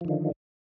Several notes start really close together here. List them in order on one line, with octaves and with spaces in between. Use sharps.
F3 D#3 D3